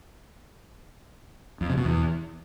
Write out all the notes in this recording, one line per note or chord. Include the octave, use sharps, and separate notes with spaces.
F2
C3
B2
E2